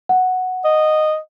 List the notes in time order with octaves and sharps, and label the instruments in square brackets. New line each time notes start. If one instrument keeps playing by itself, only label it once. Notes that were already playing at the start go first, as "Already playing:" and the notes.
[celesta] F#5
[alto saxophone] D#5